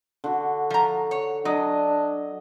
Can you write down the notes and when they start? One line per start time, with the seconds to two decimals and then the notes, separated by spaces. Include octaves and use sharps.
0.24 D3 F#4
0.70 F3 A#5
1.11 C#5
1.45 F#3 D4 D#5